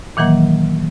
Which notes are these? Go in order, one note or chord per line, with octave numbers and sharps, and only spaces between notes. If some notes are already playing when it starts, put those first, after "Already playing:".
A#2 D#3 E3 F#3 A#3